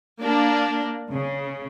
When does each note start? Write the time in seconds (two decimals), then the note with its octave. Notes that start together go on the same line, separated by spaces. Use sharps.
0.21 A#3 D4
1.10 C#3